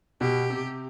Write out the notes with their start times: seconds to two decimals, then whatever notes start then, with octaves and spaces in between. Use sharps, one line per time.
0.21 B2 G4
0.50 C3